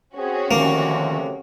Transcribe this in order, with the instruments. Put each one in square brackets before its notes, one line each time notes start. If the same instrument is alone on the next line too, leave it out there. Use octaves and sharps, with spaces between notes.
[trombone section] C4 G#4 [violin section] C#4 F#4
[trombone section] D2 C3 [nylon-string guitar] D#3 F3 [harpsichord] A#3